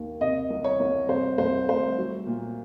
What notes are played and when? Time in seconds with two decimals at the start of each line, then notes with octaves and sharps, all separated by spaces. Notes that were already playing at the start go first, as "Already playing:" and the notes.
Already playing: D#2
0.21 C3 D#5
0.50 C2
0.64 C#5
0.80 C2
1.09 C3 C5
1.38 C2 C5
1.69 A3 C5
1.97 F#3
2.27 A#2